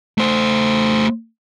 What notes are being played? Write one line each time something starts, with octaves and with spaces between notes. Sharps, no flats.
A3 C5